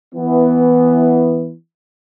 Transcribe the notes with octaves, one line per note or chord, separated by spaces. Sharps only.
E3 B3